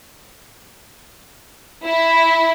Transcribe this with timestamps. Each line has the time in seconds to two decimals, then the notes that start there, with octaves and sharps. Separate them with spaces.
1.84 E4